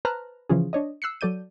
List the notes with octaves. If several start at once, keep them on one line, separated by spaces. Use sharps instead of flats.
B4 C5 A5 A#5 F6 F#6
C#3 E3 F3 C#4 F4 G#4
D4 C#5 D#5
E6 F#6 C7 C#7
F#3 A4 D5 G6 D#7